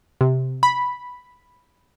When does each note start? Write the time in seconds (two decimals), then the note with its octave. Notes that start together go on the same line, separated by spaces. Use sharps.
0.21 C3
0.63 B5